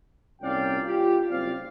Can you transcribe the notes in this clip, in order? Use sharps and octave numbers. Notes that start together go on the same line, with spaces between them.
C2 A#2 C#4 D5 F5 G5
F4 G4
F#1 G3 C4 D5 F5